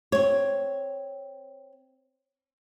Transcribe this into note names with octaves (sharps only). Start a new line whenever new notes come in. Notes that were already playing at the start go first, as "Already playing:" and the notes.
C4 C#5